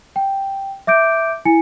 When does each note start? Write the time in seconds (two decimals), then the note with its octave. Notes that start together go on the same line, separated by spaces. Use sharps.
0.16 G5
0.87 E5 D6 G6 D7
1.45 E4 G#5 C#7